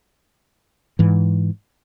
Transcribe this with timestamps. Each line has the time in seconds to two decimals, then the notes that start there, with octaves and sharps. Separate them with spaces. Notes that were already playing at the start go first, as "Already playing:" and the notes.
0.99 G#2 E3